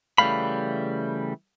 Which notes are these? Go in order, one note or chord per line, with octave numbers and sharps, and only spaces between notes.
C#3 E3 G3 A3 F5 B5